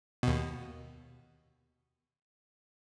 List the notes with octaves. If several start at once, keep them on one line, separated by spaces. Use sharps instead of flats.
D#2 B2